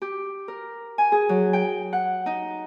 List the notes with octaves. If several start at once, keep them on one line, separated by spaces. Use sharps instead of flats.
G4
A#4
G#5
G#4
F#3
G5
F#5
D#4